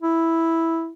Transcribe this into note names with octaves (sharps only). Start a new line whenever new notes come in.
E4